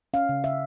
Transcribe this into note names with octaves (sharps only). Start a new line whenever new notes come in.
C#4 F5
C#3
C#3 E5